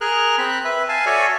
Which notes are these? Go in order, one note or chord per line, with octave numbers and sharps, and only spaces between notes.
G#4 A#4 F6 F#6
C4 B5 F#6
B4 E5
F5 G#5 A5
F#4 A4 C#5 D5 E5 G#5